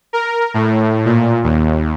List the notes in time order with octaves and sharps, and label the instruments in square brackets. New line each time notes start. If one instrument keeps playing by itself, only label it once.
[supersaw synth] A#4
A2
A#2
D#2